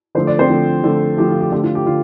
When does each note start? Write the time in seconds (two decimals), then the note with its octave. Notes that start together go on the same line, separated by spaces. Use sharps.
0.15 D3 F3 A3 C5
0.27 D5
0.39 C4 C5
0.49 D3 F3 A3
0.84 D3 F3 A3
1.17 D3 F3 A3 G4
1.29 F4
1.41 G4
1.52 D3 A3 G4
1.64 F4
1.75 G4
1.86 D3 F4